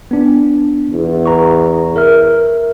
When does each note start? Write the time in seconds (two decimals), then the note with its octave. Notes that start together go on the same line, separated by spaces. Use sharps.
0.11 B3 D4
0.93 E2
1.26 B4 A#5 C#6
1.96 A#4 E5 F6